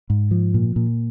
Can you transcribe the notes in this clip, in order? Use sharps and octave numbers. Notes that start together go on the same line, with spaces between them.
G#2
F3
A#2
A#2